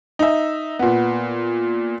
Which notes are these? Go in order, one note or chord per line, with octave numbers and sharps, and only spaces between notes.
D#4 E5
A#2 B3